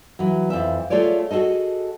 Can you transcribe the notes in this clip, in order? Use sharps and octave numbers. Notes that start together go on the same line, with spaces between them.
E3 F#3
F2 E3 E5
A3 F4 G#4 C#5 D5
F#4 G#4 A4 D#5